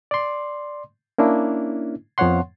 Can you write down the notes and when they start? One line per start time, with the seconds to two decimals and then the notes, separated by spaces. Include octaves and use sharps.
0.11 D5 C6
1.18 A#3 C#4 D4 E4
2.18 F2 F3 B3 C#5 F#5 C6